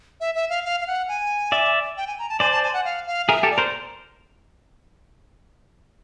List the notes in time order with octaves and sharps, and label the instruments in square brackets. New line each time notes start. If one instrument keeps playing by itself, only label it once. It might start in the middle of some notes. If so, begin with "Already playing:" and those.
[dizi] E5
E5
F5
F5
F5
F#5
G#5
[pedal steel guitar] D5 E5
[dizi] G5
G#5
A#5
A5
[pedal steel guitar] C5 D5 [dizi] G#5
[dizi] A5
G#5
F#5
F5
F5
[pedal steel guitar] G#4 A#4 [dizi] E5
[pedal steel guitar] G4 A4
[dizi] D5
[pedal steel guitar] A#4 C5